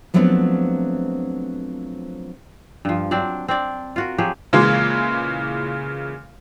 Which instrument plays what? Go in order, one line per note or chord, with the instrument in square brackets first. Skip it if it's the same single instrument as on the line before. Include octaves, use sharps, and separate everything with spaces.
[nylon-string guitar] F3 F#3 A3 B3 C4 D4
[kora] G2 F3
F#3 C4 D4 D5
C4 D4 D5
F4 F#4 A#4
F3 F#3 G4 G#4
[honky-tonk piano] A#2 C#3 E3 G#3 A#3